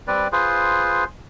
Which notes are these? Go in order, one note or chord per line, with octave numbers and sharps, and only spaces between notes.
G3 C4 B4 D5
F4 G#4 B4 C5